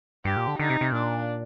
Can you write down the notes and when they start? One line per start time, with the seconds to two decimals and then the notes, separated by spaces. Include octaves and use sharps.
0.25 G2 G4
0.37 A#2
0.47 D3
0.59 D3 D#4
0.70 C3
0.81 C3
0.92 A#2 D4